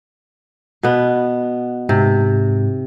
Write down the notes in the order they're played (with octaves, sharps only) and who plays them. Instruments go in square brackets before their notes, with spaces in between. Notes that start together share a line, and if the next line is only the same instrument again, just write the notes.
[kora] B2 B3
[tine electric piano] G#2 [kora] C3